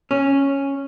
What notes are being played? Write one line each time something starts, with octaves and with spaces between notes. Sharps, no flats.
C#4